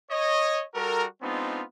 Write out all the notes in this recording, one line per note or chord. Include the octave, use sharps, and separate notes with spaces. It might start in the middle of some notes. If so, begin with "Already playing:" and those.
C#5 D#5
G3 F#4 A4 A#4
G#3 B3 C4 D4 D#4 F4